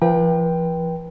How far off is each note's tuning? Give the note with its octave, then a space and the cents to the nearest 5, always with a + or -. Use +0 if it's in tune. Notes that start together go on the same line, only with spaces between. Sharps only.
F3 -40 B4 -40 G5 +0